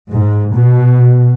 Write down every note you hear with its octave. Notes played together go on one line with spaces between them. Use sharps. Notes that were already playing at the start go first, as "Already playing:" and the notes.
G#2
B2